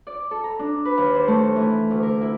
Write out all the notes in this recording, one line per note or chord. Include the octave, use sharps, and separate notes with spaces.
D5
A4
A#5
D4
B4
D#2
C5
A3
E3
D2
A#4
E4